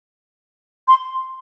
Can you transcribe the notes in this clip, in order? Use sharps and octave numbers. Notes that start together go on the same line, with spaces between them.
C6